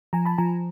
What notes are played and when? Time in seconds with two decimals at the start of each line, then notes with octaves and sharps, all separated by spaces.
0.13 F3 G#5 A#5
0.25 A5 B5
0.38 F3 G#5 A#5